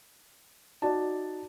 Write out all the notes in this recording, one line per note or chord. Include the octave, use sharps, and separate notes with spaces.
D#4 F#4 D5 A5